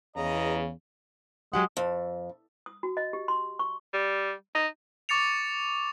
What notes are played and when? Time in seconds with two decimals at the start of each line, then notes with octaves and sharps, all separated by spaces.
0.16 E2 C#3 D#5 A#5
1.54 F#3 G#3 G4 F#5
1.77 F2
2.66 D#6
2.83 F#4
2.97 D#5
3.13 G4
3.28 C6
3.59 C#6
3.94 G3
4.55 D#4
5.09 C#6 D6 A6 C#7 F7